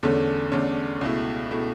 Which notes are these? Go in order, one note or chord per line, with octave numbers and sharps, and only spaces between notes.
E2 D3 A3 C#4
E2 D3 A3 C#4
C#2 B2 A3 E4
B2 A3 E4